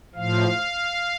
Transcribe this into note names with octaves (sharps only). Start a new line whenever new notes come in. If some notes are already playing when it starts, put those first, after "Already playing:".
A2 F3 F5